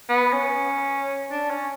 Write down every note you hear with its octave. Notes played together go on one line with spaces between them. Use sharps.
B3
C#4
D4
C#4